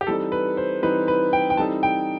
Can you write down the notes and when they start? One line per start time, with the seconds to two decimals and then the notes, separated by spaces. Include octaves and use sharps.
0.01 G4
0.07 E3 G3 C4 D#4 A4
0.32 B4
0.57 C5
0.82 E3 G3 C4 D#4 B4
1.08 B4
1.33 G5
1.50 G5
1.57 E3 G3 C4 D#4 A4 A5
1.83 G5